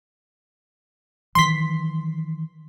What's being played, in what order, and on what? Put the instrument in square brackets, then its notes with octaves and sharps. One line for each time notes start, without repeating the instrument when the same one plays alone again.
[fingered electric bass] D#3 E3 F#3 [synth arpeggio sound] C6 B6